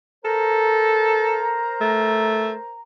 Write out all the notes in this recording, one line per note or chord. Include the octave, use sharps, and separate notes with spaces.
A4 A#4 C5 A#5
A3